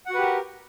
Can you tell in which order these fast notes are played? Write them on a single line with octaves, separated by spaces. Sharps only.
F#5 F#4 B4 G4 A#4